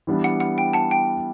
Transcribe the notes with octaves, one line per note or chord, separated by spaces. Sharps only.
E3 G3 B3 D4
F#5
F#5
G5
F#5 A5
G5